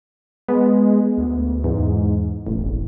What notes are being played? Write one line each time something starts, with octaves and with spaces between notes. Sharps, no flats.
G#3 B3
D2
E2 G#2
E1 A1